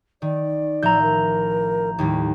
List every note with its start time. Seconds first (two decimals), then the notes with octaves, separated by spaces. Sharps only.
0.22 D#3 D5
0.83 A1 F3 E5 A#5 G6
1.01 A#4
1.99 D#2 A2 G3 E4